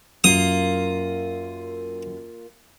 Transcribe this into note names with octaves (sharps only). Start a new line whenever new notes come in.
F#2 A#3 F4 D#6